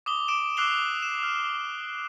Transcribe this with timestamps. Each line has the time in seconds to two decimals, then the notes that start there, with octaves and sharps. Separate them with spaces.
0.06 D6 D#6 G7
0.28 D6 D7 E7
0.57 D6 E6 F#6 C7 F7 G7
1.02 E7
1.23 F6